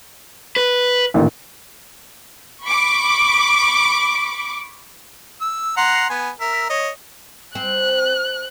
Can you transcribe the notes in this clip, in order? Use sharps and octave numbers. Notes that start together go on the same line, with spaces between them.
B4
A1 A#2 D#3
B5 C#6 D6
E6
F#5 A#5 C6
B3 G#5
A#4 E5
C#5 D#5
C4 F#6